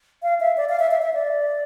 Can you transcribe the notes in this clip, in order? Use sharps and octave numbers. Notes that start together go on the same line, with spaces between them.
F5
E5
D5
F5
E5
E5
E5
D5